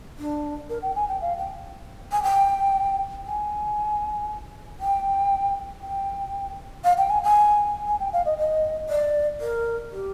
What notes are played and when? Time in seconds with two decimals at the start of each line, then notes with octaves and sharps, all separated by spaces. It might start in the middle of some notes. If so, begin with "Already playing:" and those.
0.18 D4
0.70 A#4
0.82 G5
0.96 G#5
1.08 G5
1.21 F5
1.38 G5
2.12 G#5
2.23 G5
3.26 G#5
4.80 G5
5.82 G5
6.84 F5
6.98 G5
7.10 G#5
7.23 G#5
7.87 G#5
8.00 G5
8.13 F5
8.26 D#5
8.38 D#5
8.89 D5
9.41 A#4
9.92 G4